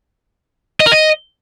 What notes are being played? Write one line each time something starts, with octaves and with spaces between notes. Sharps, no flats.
D#5
A#4
D#5